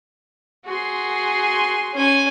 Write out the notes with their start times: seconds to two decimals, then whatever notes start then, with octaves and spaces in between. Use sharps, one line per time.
0.66 F#4 G#4 C6
1.94 C#4 G#5